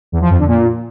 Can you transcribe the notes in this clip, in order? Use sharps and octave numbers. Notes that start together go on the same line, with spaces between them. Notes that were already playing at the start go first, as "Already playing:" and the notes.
E2
F3
F2
D3
A#2